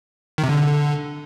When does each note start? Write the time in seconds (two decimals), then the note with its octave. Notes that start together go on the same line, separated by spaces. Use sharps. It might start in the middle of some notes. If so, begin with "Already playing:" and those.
0.38 D#3
0.44 C3
0.49 D3